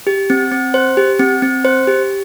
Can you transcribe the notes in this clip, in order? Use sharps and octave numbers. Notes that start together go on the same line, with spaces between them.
G4
C4
C4
C5
G4
C4
C4
C5
G4